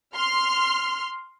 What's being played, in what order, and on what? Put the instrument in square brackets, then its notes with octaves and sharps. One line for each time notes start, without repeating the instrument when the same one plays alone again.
[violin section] C6 F6